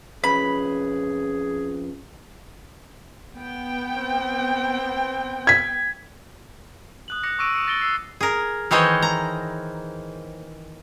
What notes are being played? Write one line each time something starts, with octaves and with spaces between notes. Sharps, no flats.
F2 C#4 G#4 B4 B5
B3 G5
C4
G#6 B6
D#6 F#6 F#7
D6 F#6 A#6 C#7
C#6 D6 E6 A#6 D7 D#7
D#6 C#7 D7
A6 A#6 C#7 D7 G7
E6 C7
G#4 A#4
D#3 E3 C5 C#5 D#5
A#5